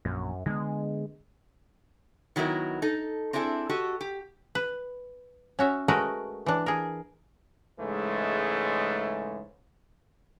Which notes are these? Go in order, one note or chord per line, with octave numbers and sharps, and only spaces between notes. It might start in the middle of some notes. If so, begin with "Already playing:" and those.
A#1 F#2
D3 G#3 B3
D#3 F#3 B3 E4 A#4
D#4 A4
C4 D4 E4 G#4 A4
F#4 G4 A4 D#5
G4
B4
C#4 F#4 E5
G#3 A3 F#4 A#4 B4 D#5
E3 D4
G#4 A#4
G#2 C#3 E3 G#3 A3